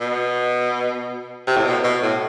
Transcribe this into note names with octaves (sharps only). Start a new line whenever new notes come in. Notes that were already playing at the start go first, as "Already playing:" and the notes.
B2
C3
A2
B2
B2
A2